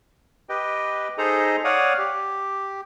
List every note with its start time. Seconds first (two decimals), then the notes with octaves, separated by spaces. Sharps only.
0.49 G4 B4 D#5 G5
1.18 D#4 G#4 A4 C5 D#5 A#5
1.64 C#5 D5 F5 F#5 D#6
1.98 G4